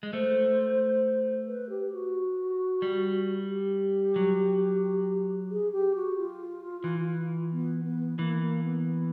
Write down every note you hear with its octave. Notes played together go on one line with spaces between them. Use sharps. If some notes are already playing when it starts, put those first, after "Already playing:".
G#3
A3 C5
B4
G4
F#4
G3
G4
F#3
G#4
G4
F#4
F4
E3
B3
B3
E3 A#3
A#3
B3